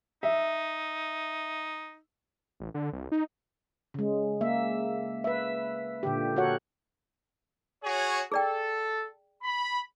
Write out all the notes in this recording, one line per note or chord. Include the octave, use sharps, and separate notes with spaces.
D#4 E5
A1
D3
C2
D#4
C#3 G#3
A#3 E5
B4 E5
A#2 D3 G4
F#4 A4 A#4 C#5 F#5
F#4 G#4 C#5
G#4 A4 D5 G5
B5